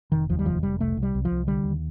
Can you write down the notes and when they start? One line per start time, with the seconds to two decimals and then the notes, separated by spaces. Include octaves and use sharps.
0.12 F1 D#3
0.29 D#2 F3
0.39 G3
0.45 F1 F3
0.63 F1 G3
0.80 C2 A3
0.97 C2
1.03 G3
1.14 C2
1.25 F3
1.31 C2
1.47 D3 G3
1.64 D#2